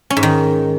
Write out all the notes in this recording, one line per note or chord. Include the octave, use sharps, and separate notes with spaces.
C#4
G#2
D#3